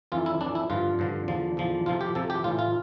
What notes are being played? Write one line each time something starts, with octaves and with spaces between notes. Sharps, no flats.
F2 E3 F4
E4
F2 E3 D4
E4
G2 D3 F3 F4
G2 D3 F3
E2 D3 F3
E2 D3 F3
F2 C3 F3 F4
G4
F2 C3 F3 A4
G4
A2 E3 F4
F4